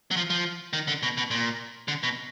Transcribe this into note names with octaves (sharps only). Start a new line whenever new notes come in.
F#3
F3
F3
D#3
D3
B2
B2
A#2
D3
B2